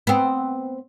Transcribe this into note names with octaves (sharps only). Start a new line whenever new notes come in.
B3 C4